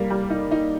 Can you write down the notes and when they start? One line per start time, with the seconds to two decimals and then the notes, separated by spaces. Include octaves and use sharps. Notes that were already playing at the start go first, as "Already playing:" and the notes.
Already playing: G3 A#3
0.10 G3
0.30 D#4
0.51 D#4